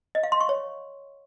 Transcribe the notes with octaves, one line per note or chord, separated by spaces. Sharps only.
D#5
F5
C6
C#6
C#5